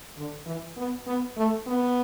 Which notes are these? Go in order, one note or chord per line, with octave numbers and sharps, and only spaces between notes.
D3
E3
B3
B3
A3
B3